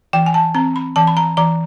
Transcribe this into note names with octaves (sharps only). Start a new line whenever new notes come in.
E3 G5
G#5
A5
C4 A#5
B5
E3 A5
B5
A#5
E3 A#5